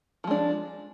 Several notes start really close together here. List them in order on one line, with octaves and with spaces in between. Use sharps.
F3 G#3 D4